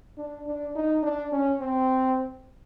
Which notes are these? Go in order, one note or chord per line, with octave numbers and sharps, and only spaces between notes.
D4
D4
D#4
D4
C#4
C4